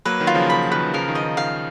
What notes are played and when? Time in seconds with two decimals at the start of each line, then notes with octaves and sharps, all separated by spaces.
0.05 F#3 A#3 B4
0.20 D#3 F#3
0.27 F4
0.35 C#3 F3
0.50 C#3 B5
0.72 D#3 B4
0.88 D#3
0.94 C#3 F3 A#4
1.08 D#3
1.15 D#5
1.22 D#3
1.37 D#3 F5